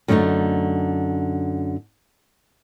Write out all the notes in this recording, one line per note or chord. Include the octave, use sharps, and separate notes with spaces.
F#2 D3 A3 B3 D#4